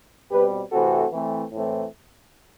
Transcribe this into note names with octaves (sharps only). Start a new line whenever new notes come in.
B2 G3 C4 G4 B4
C3 E3 A3 C4 F#4 A4
E3 A3 C4
A2 E3 A3 C4